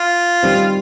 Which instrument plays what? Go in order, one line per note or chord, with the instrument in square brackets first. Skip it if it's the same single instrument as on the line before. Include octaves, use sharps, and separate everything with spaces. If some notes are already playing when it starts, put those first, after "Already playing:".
Already playing: [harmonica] F4
[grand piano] D#3 G3 C4